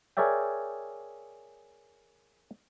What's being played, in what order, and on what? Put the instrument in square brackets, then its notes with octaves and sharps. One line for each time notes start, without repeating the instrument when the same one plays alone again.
[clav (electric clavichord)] G#4 A#4 C#5 D5 E5 G5